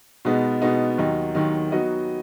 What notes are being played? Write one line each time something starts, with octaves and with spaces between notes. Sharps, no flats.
B2 G#3 B3 D#4
B2 G#3 B3 D#4
D#2 D#3 F#3 D#4
D#2 D#3 F#3 D#4
F#3 B3 D#4 F#4 D#5